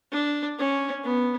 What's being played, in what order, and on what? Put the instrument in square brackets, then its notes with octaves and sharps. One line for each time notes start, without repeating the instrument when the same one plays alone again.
[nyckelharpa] D4
C#4
B3